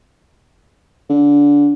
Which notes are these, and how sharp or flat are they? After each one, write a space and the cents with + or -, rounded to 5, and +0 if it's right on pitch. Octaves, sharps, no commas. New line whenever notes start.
D3 -25